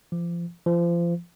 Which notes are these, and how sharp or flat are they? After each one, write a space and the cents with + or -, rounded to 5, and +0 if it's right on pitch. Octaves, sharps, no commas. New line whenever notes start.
F3 -30
F3 -30